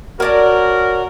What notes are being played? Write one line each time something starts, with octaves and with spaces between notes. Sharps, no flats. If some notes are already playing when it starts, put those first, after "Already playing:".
F#4 A#4 C#5 D5 A5